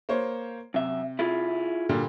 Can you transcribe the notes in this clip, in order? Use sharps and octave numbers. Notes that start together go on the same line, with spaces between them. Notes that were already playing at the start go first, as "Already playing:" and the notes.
A#3 C5 C#5
F#2 C3 E5
E4 F4 G#4
A#2 D3 G3